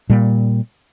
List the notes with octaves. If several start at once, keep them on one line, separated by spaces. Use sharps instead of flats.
A#2 G3